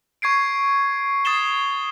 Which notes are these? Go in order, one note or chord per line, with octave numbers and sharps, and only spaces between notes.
C#6 G#6 C7 D7
D#6 A6 C7 E7 G7